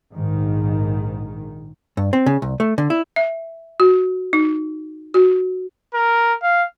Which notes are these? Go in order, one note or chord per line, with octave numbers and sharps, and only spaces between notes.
A#1 G#2 D#3
G2
C4
C#3
C2
A3
D3
E4
E5
F#4
D#4
F#4
A#4
F5